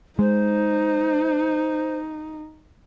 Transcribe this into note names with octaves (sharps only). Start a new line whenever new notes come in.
G#3 D#4 C5